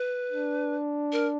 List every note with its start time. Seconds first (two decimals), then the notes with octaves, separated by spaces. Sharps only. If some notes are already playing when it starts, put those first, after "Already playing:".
Already playing: B4
0.32 D4
1.12 A#4